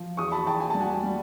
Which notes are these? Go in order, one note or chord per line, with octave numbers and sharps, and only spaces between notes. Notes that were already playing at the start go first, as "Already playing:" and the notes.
Already playing: F3
E2 C#6 D#6
A5 B5
E2 G5 A5
G#5
G3 A5
F#5 G#5
G3